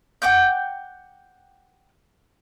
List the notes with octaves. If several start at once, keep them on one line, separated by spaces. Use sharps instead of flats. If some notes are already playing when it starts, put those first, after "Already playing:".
F#5 G5 D6 G6